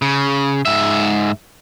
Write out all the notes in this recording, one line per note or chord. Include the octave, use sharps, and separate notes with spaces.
C#3
G#2 E5